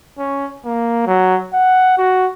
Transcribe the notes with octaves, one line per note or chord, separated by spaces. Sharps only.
C#4
A#3
F#3
F#5
F#4